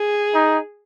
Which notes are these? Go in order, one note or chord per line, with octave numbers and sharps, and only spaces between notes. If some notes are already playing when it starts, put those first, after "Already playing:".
Already playing: G#4
D#4